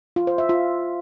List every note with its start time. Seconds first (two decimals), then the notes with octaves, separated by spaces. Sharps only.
0.16 F4
0.27 C5
0.38 E5
0.49 F4